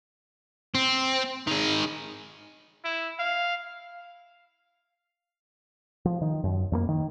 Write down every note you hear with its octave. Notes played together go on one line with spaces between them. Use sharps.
C4
D#3 G#4
E4
F5
F3
D#3
F#2
F2 A3 A#3
D#3